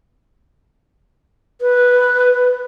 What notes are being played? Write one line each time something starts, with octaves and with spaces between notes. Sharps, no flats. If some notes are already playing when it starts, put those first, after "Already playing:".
B4